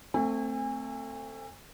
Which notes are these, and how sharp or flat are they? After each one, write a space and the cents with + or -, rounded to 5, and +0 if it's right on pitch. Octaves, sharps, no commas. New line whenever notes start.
A3 +20 C4 +5 G#5 -30